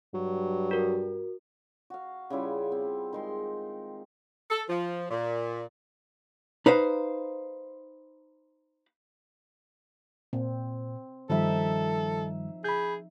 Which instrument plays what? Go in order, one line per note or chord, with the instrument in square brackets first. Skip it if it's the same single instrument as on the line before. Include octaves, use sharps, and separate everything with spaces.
[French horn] G2 [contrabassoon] F#3
[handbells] F#4 A#4
[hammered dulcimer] F#4 F5
C#3 G3 E4 F4
C4
D#3 G#3 C6
[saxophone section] A4
F3
A#2
[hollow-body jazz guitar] D#4 B4 C5 F5
[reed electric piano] A#2 [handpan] C4
[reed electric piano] G2 D#3 G3 [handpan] F3 D#4 E5 [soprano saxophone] A4
[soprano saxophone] G#4 [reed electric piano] B5 G6